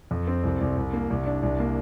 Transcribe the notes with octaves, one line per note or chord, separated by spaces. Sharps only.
F2
C4
C2
C2
C2
A#3
C2
D4
C2
A#3